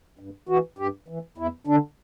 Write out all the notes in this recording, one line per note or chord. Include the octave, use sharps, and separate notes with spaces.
G2
E3 F#4
G2 G4
E3
E2 E4
D3 D4